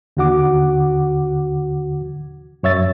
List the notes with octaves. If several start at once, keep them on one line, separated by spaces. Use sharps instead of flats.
D#2 D3 F#4 F#5 D6
F#2 C#5 E5 A6